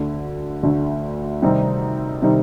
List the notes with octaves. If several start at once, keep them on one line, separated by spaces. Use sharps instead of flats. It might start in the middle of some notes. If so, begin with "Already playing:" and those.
Already playing: D2 D3 A3
D2 D3 A3
C3 D#3 G3 C4 D#4
C3 D#3 G3 C4 D#4